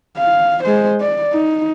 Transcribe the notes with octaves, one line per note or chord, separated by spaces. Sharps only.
F5
G#3 C5
D5
D#4